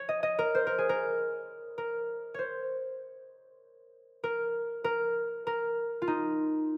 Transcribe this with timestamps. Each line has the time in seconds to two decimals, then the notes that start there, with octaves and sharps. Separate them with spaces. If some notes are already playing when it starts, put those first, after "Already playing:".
Already playing: C#5
0.09 D#5
0.23 D#5
0.39 A#4
0.55 C5
0.67 A#4
0.78 G#4
0.89 A#4
1.78 A#4
2.34 C5 C#5
4.24 A#4
4.84 A#4
5.47 A#4
6.02 F4
6.07 D#4